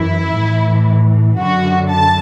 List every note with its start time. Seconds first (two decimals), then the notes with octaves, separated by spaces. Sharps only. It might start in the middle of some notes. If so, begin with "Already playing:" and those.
Already playing: F#2 E3 E4
0.34 A2 E3
1.39 F#2 D3 F#4
1.90 A5